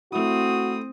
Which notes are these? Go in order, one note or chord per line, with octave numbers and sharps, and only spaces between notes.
A3 C4 E4 F#4 D#6